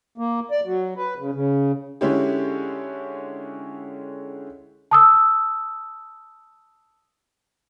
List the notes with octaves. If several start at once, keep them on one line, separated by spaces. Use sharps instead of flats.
A#3
D5
F#3
B4
C#3
C#3
D3 G#3 C#4 E4 G4
A5 D#6 E6